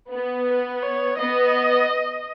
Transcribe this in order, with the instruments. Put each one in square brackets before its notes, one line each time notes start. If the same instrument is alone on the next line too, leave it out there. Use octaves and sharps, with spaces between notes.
[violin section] B3
[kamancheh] B4
C#5
[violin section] B3 [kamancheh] D#5